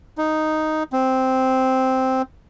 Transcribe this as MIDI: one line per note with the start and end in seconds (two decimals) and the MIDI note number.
0.18 0.83 63
0.93 2.22 60